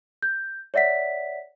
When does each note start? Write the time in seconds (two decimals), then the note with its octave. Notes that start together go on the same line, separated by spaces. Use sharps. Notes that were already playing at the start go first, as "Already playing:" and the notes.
0.22 G6
0.74 C#5 D5 E5 F#5 B6